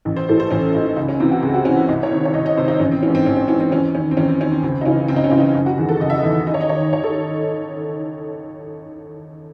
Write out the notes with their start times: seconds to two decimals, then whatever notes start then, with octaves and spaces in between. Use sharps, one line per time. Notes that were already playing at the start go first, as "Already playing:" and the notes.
0.05 A1
0.16 C5
0.29 A2 E3 A4
0.40 C5
0.51 A1 C#4
0.74 A2 D#4
0.78 E3
0.96 C#2 D#4
1.08 C#4
1.20 C3 E3 C4
1.31 F#4
1.42 C#2 G#4
1.54 F#4
1.65 C3 E3 C#4
1.77 E4
1.88 C2 D#5
2.03 C#5
2.11 C3 D#3
2.25 C#5
2.34 C2 D#5
2.46 D#5
2.57 C3 D#3 C5
2.68 D#4
2.79 A1 C#4
2.91 C4
3.02 E3 C#4
3.08 G#2
3.15 C4
3.26 A1 C#4
3.37 C#4
3.48 G#2 E3 C#4
3.60 C4
3.72 E2 C#4
3.95 D#3 C#4
4.11 C4
4.17 E2 C#4
4.28 C4
4.40 D#3 C#4
4.52 C4
4.63 C#2 C4
4.81 D#4
4.85 C#3 E3 C#4
5.08 C#2 C4
5.16 D#4
5.24 C#4
5.31 C#3 E3
5.40 D#4
5.54 F#1
5.66 F#4
5.78 E2 D#3 G#4
5.89 A4
6.00 F#1 D#5
6.10 E5
6.17 D#5
6.23 E2 D#3
6.47 D#2 D#5
6.54 C#5
6.61 D#5
6.69 D#3 C#5
6.92 D#2 C#5
7.03 A4